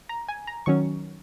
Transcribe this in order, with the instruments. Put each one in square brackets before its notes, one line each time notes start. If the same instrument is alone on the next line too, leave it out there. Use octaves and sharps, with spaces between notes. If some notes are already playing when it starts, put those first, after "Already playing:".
[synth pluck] A#5
G#5
A#5
D#3 F#3 C#4 C#6